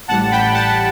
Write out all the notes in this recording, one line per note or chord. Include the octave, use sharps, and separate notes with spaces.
A1 A2 G3 F#5 A5
G5 B5
F#5 A5